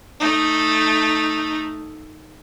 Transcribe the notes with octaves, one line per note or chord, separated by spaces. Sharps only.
A3 D#4